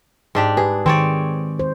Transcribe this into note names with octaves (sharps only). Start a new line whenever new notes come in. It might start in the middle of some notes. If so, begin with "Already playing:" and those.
G#2 D4 G4
G4 G#4 B4
D#3 C4 C#5 D5
C5